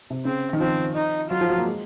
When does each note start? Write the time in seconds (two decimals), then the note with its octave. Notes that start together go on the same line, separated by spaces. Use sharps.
0.10 C3
0.25 C#3 C4
0.53 D#3
0.60 F3 C4
0.95 D#4
1.30 F#3 F4
1.41 F3
1.50 F#3
1.58 A#3
1.65 G#3